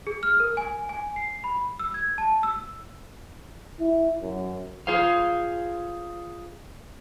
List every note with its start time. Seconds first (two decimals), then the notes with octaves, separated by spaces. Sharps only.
0.07 G#4
0.23 F6
0.40 A#4
0.57 G#5
0.89 G#5
1.16 C7
1.44 B5
1.79 E6
1.94 G#6
2.18 A5
2.43 E6
3.80 E4
4.22 F#2
4.87 F4 G#4 C5 F5